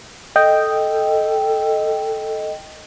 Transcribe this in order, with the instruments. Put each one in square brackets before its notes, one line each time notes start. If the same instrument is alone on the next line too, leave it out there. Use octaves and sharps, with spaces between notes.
[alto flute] A4 [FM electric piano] D#5 G5